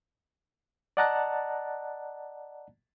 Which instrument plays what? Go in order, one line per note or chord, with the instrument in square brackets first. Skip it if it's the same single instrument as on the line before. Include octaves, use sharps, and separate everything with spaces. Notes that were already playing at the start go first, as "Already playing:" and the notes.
[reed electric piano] D5 D#5 F#5 A5 A#5 F#6